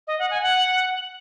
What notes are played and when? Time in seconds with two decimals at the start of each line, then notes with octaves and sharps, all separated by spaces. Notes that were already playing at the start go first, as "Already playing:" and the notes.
0.07 D#5
0.19 F#5
0.31 G#5
0.42 F#5